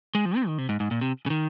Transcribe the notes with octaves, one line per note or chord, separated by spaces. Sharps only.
G#3
F3
C4
D#3
C3
G#2
G#2
A#2
C3
C#3
D#3